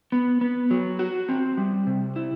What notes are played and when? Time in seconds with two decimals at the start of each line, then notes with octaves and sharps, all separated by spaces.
0.12 B3
0.41 B3
0.71 F#3
0.99 F#4
1.29 C4
1.57 G3
1.87 C3
2.16 E4